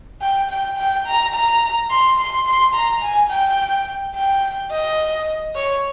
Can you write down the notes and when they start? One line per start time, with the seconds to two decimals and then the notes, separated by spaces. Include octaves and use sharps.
0.22 G5
0.50 G5
0.78 G5
1.07 A#5
1.34 A#5
1.90 C6
2.19 C6
2.47 C6
2.74 A#5
3.03 G#5
3.30 G5
4.15 G5
4.71 D#5
5.55 C#5